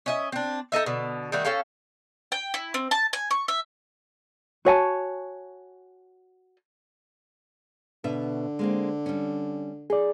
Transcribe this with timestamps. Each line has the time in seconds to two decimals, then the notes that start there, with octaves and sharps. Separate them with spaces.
0.06 C#4 D#5 E5
0.32 C4 D4
0.72 D#4 A4 D#5 E5
0.86 B2 D3
1.32 D#3 G3 A3 F#4
1.45 C#4 A4 F5 G5
2.32 G5
2.54 E4
2.74 C4
2.91 A5
3.13 G#5
3.31 C#6
3.48 E5
4.65 F#4 C#5 G#5 A5
8.04 B2 D3 E5
8.59 G#3 A#3 C4
9.06 G3 C#4
9.90 D#4 G#4 D5